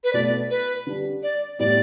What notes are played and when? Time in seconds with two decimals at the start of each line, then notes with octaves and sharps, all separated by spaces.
0.04 B4
0.13 B2 A3 E4 D5
0.50 B4
0.87 D3 G3 D4
1.23 D5
1.59 A2 G3 B3 E4 D5